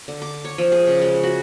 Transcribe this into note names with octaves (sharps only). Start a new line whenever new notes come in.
D3
D6
C#5
F3
G#4
C#3
G#3
F#4